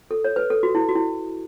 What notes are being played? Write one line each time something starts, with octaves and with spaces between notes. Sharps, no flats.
A4
C#5
B4
A4
F#4
E4
F#4
E4